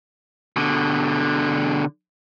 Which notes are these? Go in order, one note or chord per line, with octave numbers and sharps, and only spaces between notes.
B2 D3